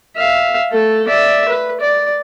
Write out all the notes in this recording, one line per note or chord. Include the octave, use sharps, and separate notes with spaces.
E5 F5
A3 A4
D5 E5
B4
D5